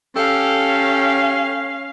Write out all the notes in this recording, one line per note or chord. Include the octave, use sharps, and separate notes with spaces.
C#4 G4 A4 F5